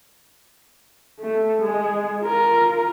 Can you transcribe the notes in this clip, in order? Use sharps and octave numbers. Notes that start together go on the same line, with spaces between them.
A3
G#3 G#4
F4 A#4